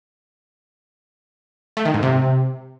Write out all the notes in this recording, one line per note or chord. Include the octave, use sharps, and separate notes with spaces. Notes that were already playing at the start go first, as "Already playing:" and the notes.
A3
D#3
G#2
C3